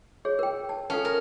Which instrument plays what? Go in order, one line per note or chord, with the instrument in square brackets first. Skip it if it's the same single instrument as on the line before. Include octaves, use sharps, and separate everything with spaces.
[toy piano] G#4 C#5
A#4 G5
A5
[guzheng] C#4 [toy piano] A4 F5 A5
[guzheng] A#4